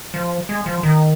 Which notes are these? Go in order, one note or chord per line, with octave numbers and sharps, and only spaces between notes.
F3
G#3
F3
D#3